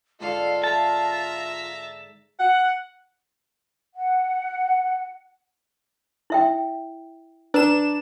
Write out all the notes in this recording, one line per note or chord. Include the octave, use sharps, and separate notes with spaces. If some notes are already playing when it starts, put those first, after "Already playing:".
G#2 D3 F4 A4 D5 F5
E5 A5 A#5
F#5
F#5
E4 E5 G5
D4 B4 A#5 E7